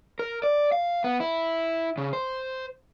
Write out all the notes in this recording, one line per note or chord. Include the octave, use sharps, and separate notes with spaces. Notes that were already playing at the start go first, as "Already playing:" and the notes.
A#4
D5
F5
B3
E4
C#3
C5